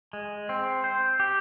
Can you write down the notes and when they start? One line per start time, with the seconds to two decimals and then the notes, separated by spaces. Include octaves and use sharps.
0.13 G#3
0.49 C4
0.84 C5
1.20 G4